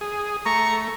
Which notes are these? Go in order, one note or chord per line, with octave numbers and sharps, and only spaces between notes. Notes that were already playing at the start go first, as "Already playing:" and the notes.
G#4
A3 A#5 C#6